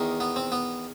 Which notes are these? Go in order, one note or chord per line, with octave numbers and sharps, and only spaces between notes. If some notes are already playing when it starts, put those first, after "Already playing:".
Already playing: E2 D#3
B3
C4
B3